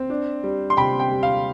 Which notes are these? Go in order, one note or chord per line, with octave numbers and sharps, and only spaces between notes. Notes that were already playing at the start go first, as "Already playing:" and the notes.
Already playing: C4
D4
G3
C6
C3 G5 B5
G5
G3
F5